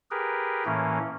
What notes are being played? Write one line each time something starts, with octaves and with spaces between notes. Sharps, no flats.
G4 G#4 A#4 B4
A2 E3 A#3 C#4